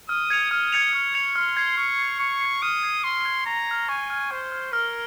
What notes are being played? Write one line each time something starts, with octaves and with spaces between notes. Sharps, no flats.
D#6 F6
G#6 C#7 F7
D#6 F6
G#6 C#7 F7
C#6 F6
G#6 C#7 F7
C6 F6
G#6 C7
C#6 F6
G#6 C7
C#6 F6
G#6 C7
D#6 F6
G#6 C7
C6 C#6
F6 G#6
A#5 C#6
F6 G#6
G#5 C#6
F6 G#6
C5 C#6
F6 G#6
A#4 F6